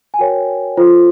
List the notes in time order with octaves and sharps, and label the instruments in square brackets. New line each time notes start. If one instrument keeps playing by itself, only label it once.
[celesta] G#5
F#4 A#4 C#5 G5
F4 A4 C5